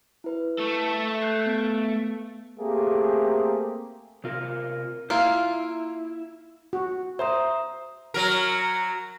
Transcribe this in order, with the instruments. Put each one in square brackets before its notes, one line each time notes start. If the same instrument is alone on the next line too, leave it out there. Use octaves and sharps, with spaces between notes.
[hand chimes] E4 B4
[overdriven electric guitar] A3 A4
[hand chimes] F#6 G6 C7
B3 D7
[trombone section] A3 A#3 C4 G4 G#4
[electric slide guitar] C3 F4 A#4
[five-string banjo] A#3 F4 [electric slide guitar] E4 [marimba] F5
[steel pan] F#4
[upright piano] C5 [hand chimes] E5 A#5 D#6
[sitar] F#3 A#4